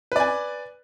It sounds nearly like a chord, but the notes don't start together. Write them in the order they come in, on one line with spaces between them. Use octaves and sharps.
B4 D5 G#5